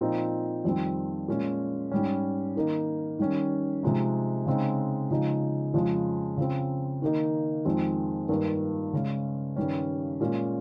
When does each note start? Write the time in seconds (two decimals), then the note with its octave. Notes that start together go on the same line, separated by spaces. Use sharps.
0.01 A#2 F3 C4 D#4
0.65 F2 D#3 G3 C4
1.28 A#2 G#3 C#4
1.91 G#2 G3 C#4
2.56 D#3 A#3 D#4
3.19 D#3 G3 C#4
3.83 C3 F3 G#3 D#4
4.46 C#3 G#3 C4 D#4
5.11 C#3 F3 G#3 D#4
5.74 F2 C#3 F3 G#3
6.37 C#3 F3 C4
7.02 D#3 A#3 D#4
7.65 F2 D#3 G#3 C4
8.29 G2 D#3 A#3
8.93 C#3 G#3 C#4
9.56 G2 D#3 G3 C#4
10.20 A#2 G#3 C#4